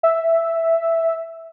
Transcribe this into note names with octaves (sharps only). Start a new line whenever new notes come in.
E5